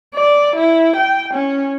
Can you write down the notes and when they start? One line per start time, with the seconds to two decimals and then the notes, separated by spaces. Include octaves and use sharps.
0.15 D5
0.56 E4
0.96 G5
1.34 C#4